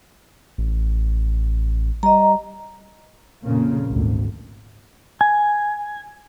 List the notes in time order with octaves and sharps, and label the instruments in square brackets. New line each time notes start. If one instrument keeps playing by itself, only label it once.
[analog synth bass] A1
[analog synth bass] G3 [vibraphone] D#5 A#5
[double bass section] F2 A#2 C#3 A#3
G#1 D2
[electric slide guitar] G#5